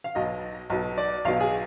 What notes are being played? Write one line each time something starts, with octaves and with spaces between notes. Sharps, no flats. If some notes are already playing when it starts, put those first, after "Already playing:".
F5
B1 B2 D#5
B1 B2
D5
B1 B2 F5
G#4